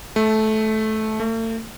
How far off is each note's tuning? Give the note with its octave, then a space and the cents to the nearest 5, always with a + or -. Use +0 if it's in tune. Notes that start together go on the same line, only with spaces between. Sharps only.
A3 -15
A3 +40